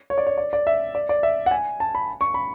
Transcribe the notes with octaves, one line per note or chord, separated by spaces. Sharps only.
C#5
D5
C#5
D5
D5
E5
D5
D5
E5
F#5
G#5
A5
B5
C#6
B5